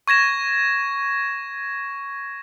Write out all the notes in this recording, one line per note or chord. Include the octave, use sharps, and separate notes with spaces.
C#6 G#6 A#6 E7